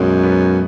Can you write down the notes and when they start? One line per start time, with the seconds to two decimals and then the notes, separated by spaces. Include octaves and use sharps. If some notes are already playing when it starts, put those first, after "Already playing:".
Already playing: B1 F#2 B2 G#3
0.24 B3